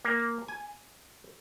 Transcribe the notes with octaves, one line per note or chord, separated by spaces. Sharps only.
A#3
G#5